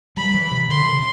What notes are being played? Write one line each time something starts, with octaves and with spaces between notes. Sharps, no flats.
G3 B5
E3
C3
D3 C6
C3